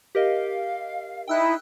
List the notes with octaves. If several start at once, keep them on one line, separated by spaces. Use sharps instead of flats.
G4 A#4 D#5 F5
D#4 E4 G5 E6 F#6